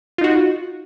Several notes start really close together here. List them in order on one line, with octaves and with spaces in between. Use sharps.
F4 D#4 F#4